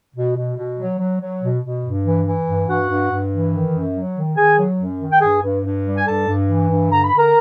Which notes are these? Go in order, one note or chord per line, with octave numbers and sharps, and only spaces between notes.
B2
B2
B2
F#3
F#3
F#3
B2
B2
G2
E3
E3
G2
G2 F#4 F#5
G2
G2
E3
D#3
F#2
F#3
D#3
D#3 G#4 G#5
F#3
F#2
D#3
G5
G2 G#4 G#5
G2
G2
G3
G#5
G2 A4 A5
G2
E3
G2
D3 A#5
B5
D3
A#4 A#5